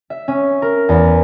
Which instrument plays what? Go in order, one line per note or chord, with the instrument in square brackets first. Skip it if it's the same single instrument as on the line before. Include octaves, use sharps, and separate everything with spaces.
[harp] E5
C#4
A#4
E2